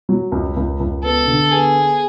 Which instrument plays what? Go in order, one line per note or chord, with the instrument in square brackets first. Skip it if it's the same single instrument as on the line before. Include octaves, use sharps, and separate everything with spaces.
[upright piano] F#3
C#2
C#2
C#2
[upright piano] B3 [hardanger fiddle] A4
[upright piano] D3
[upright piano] B3 [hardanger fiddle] G#4
[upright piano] B3